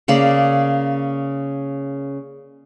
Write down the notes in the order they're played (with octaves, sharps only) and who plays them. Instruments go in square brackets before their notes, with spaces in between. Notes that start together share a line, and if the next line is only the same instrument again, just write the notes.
[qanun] C#3 A#3 D5